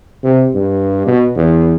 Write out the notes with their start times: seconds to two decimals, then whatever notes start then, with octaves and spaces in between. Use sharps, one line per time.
0.23 C3
0.54 G2
1.07 B2
1.36 E2